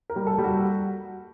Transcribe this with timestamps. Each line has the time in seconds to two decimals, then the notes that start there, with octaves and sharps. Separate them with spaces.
0.10 A#4
0.16 G3
0.27 A4
0.38 G3
0.44 F#4